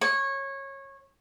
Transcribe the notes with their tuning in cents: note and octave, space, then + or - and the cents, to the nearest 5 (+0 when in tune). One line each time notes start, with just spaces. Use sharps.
C#5 -20